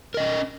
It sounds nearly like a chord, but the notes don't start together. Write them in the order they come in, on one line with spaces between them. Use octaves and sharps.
A#4 D#5 C#4